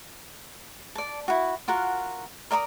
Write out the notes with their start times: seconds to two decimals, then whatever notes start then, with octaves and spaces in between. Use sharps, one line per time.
0.95 D5 A5
1.28 E4 F#4
1.68 F4 F#4 A#4 F#5
2.51 A#4 D5 A#5 D#6